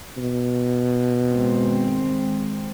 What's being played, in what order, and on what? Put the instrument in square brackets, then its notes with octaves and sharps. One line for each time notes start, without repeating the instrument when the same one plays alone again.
[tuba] B2
[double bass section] D#3 G#3 C4